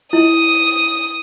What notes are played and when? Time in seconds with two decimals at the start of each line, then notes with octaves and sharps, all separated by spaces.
0.13 E4 D#6